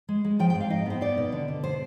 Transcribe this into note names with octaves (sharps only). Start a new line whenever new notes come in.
G#3
G#3
F3 G5
G5
G#2
F5
D#4 D#5
B3 C5
D#4 D5
B2
D3
D3
B3 C5